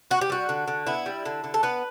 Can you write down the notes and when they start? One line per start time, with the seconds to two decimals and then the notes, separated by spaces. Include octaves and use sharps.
0.11 B3 F#4
0.21 G4
0.30 G3 F#4
0.49 D3
0.68 D3
0.86 B3 E4
1.06 G3
1.25 D3
1.44 D3
1.54 A4
1.63 B3 B4